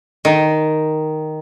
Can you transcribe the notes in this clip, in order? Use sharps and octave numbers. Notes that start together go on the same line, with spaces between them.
D#3